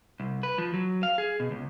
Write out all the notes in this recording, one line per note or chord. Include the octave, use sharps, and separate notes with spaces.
C2
B4
F3
F#3
F5
G#4
B2
C#2